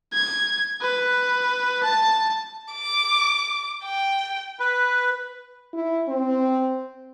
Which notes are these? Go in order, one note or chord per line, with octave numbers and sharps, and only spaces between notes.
G#6
B4
A5
D6
G5
B4
E4
C4